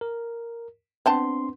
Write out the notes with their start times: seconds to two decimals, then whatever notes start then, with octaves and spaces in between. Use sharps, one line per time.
0.01 A#4
1.06 B3 C4 D4 G5 A5 C6